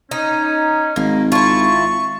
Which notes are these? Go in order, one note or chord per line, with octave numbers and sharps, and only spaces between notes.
C#4 D#4
G#1 A#3
E4 F4 A5 C#6